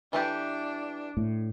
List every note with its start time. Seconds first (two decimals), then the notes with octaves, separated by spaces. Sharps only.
0.13 E3 A3 D4 G4
1.17 A2